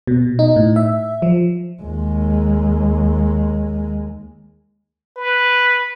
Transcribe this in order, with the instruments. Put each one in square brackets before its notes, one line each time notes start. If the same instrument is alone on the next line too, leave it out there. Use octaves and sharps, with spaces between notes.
[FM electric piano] B2
D#4
A2
E5
F3
[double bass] D#2 G#3
[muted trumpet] B4